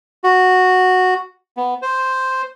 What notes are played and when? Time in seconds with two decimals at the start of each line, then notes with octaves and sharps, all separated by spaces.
0.24 F#4
1.57 B3
1.82 C5